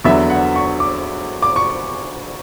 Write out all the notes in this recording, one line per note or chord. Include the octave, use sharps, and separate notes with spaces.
E2 D3 F#3 B3 E5
F#5
C#6
D6
D6
C#6